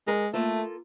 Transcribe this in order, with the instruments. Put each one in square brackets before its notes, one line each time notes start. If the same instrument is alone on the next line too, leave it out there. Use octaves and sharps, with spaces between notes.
[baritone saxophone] G#3 [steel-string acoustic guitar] A#4 A#5
[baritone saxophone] A3 [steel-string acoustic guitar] A#3 F4 A4